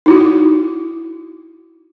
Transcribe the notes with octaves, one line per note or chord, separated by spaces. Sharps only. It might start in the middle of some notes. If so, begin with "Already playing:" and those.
D#4 E4 F#4